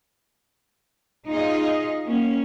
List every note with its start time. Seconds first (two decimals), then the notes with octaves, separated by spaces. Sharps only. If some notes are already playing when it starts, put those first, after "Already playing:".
1.26 D#4 F4 G#4 D#5
2.03 A#3 C#4